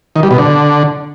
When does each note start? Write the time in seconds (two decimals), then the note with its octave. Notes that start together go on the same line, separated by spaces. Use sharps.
0.16 D#3
0.23 G3
0.31 B2
0.38 D3